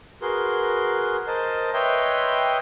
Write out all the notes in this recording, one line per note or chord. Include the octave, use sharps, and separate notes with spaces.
F#4 G#4 A#4 B4 C6
A#4 C5 D#5 A5
B4 C#5 D#5 E5 G5 C6